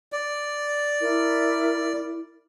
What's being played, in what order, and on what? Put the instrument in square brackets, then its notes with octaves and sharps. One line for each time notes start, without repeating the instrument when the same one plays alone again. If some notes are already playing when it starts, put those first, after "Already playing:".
[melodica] D5
[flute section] E4 A#4